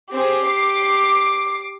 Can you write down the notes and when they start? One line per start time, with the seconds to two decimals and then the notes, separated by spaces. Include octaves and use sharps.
0.13 C4 G4 G#4
0.46 D6 C7